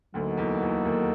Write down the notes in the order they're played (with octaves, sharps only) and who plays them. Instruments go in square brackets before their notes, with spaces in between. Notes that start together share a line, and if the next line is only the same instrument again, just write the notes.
[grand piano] D2 D3 [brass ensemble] F#3 A#3 D#4 F#4 A4
[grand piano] E2 E3
E2 E3
D#2 D#3